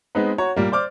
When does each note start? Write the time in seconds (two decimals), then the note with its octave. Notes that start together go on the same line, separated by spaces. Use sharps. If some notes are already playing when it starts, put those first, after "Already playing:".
0.15 G#3 B3 C4 D#4 B4
0.38 F#4 C#5 A#5
0.56 A#2 G3 A#3
0.72 C5 D5 D6 F6